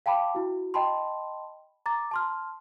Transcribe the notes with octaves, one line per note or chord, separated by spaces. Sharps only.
F5 G5 A5 B5 D6
E4 F#4
D#5 G5 A5 B5 C6
A#5 D6 A6
A5 C6 F6